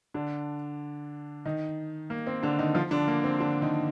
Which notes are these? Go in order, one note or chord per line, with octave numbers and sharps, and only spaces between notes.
D3 D4
D#3 D#4
A#3
C4
D3 D4
D#3 D#4
F3 F4
D3 D4
A#3
C4
D3 D4
D#3 D#4